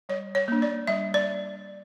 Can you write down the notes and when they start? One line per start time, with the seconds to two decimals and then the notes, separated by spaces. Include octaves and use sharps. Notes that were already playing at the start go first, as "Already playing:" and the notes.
0.09 G3 C#5
0.35 C#5
0.48 A#3 D4
0.62 D5
0.87 G3 E5
1.14 D5